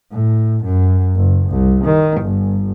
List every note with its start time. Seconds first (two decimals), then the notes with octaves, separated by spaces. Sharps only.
0.12 A2
0.64 F#2
1.16 F#1
1.49 C2
1.84 D#3
2.21 G1